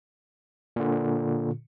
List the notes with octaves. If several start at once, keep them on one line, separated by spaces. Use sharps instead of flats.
A#2 D3